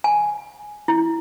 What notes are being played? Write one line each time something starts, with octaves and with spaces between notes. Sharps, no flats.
G#5
E4